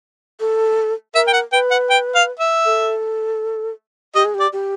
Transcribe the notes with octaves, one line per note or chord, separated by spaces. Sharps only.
A4
A#4 E5
G5
F#5
B4 G5
F#5
G5
F5
E5
A4
G4 D#5
G#4
G4
D5
G4